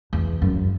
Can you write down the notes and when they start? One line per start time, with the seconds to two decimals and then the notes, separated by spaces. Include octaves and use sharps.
0.13 E2
0.42 F#2